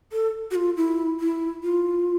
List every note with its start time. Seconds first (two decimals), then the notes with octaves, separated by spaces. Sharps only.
0.12 A4
0.51 F#4
0.55 F4
0.77 E4
1.20 E4
1.63 F4